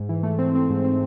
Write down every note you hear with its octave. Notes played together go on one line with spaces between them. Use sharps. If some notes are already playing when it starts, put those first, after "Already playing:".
Already playing: G#2
E3
A3
C4
C4
G#2
C4